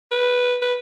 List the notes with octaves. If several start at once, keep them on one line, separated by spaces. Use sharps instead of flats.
B4
B4